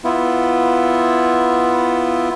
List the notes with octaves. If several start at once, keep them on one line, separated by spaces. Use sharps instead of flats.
B3 E4 F4